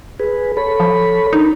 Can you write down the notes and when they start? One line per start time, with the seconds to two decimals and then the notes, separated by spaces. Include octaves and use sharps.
0.20 G#4 B4
0.57 A4 C#5 B5
0.80 F3
1.33 D4 D#4 A#4